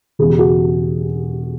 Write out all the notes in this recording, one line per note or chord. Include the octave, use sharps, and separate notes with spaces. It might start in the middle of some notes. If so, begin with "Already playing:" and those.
E1 E2 C#3 G#4
G4
F#4 G#4